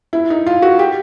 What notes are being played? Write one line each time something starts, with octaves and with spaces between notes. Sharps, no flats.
E4
D#4
F4
F#4
G4